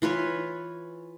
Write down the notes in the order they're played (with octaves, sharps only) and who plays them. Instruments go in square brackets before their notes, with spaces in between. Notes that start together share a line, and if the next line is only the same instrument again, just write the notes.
[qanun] E3 F4 B4 C#5